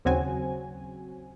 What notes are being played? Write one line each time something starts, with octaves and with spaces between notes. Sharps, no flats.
D#2 C#3 F#3 C4 F#4 G#5